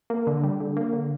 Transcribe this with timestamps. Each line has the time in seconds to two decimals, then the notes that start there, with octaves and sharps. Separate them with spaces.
0.10 A#3
0.27 D3
0.44 G3
0.60 D3
0.77 A#3
0.93 D3